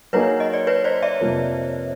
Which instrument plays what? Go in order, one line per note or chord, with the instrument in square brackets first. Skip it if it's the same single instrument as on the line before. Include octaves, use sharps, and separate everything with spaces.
[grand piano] F#3 A#3 D#4 G#4 [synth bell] B4 C#5
[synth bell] D#5
D5
B4 C#5
C5 D5
D5 E5
[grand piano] F2 C3 F3 A#3